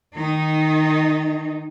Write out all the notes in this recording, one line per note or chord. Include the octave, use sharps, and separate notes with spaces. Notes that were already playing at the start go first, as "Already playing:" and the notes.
D#3 D#4